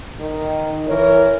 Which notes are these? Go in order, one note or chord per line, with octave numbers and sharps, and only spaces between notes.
D#3
E3 A#4 C#5